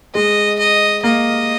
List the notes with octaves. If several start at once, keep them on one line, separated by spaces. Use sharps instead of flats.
G#3 D#5
D#5
A#3 D#5